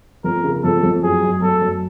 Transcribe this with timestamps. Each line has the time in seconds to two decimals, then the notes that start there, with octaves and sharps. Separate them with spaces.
0.24 F2 A#4
0.44 C#3
0.63 F2 A4
0.83 F2
1.03 F#2 G#4
1.23 F#2
1.42 F#2 A4
1.62 F#2